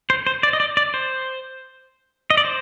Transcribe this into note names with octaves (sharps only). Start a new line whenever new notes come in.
C5
C5
D5
D#5
D5
D5
C5
D#5
D5
C5